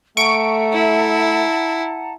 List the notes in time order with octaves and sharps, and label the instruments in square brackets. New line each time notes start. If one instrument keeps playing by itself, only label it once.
[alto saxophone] A3 [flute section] F#5 A5 A#5 [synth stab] C#6 D7
[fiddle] E4